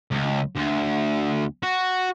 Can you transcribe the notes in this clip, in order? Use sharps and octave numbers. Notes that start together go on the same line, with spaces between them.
C#2
D2
F#4